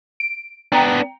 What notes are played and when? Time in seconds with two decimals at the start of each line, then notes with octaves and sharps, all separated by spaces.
0.20 D7
0.72 B3 D4 G5 A#5